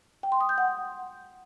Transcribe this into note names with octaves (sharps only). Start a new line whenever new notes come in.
G5
C6
D#6
G6
F#5